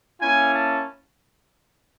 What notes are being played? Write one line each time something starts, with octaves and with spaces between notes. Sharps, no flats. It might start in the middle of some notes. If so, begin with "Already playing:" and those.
A#3 C#4 E4 G#5
A5